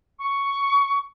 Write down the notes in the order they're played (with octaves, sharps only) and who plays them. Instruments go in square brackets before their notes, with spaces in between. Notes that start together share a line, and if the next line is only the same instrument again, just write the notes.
[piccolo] C#6